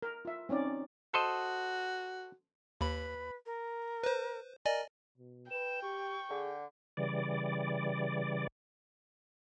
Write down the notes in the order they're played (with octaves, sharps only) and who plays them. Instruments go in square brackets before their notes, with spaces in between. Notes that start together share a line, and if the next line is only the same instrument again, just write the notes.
[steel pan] A#4
F4 E5
C4 C#4 D#4 D5
[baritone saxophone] F#4 [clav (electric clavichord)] A4 C5 D#5
[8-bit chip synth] D#2 B5 [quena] B4
[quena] A#4
[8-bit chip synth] B4 C5
[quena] A#4 [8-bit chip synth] D5 D#5 G#5
[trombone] B2
[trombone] B4 [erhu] G5 [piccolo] E7
[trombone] G4 [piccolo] C#6
[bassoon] D3 [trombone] G#4
[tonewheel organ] C#3 E3 G3 D5